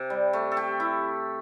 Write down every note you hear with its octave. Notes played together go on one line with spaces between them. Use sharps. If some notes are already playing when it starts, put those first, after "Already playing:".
Already playing: C3
G3
A3
A4
G4
E4